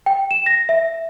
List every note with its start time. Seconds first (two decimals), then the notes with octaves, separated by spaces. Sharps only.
0.06 G5
0.31 E7
0.46 A#6
0.69 E5